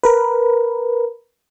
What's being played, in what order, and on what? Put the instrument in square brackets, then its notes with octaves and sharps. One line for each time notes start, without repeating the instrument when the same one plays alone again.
[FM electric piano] A#4 B4